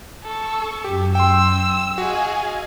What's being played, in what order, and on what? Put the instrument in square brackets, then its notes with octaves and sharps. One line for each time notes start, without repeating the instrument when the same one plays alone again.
[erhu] A4 [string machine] C#6 E6
[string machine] F#2 [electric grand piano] G4
[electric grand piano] G5 C6 [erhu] E6
[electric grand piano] F#4 [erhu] G#4 [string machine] D#5 F5 G#5